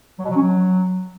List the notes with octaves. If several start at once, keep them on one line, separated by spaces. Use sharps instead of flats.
F#3
B2
F#3
C#4
F#3